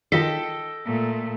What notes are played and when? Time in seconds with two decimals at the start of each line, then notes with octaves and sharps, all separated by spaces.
0.12 D#3 F4 A4 D#5 G5 B6
0.85 A#2 A3